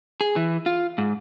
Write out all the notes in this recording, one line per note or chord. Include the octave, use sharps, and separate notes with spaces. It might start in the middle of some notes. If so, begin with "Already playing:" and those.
G#4
E3
F4
G#2